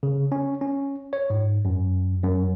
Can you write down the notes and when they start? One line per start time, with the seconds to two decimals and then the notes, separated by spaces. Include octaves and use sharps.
0.03 C#3
0.32 C#4
0.61 C#4
1.13 C#5
1.30 G#2
1.65 F#2
2.23 F#2